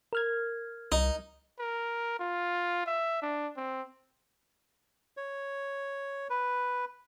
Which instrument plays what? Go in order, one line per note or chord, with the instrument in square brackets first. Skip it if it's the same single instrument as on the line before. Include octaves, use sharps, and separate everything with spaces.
[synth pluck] A#4 F6 G#6
[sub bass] C2 [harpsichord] D#4
[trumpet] A#4
F4
E5
D4
C4
[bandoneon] C#5
B4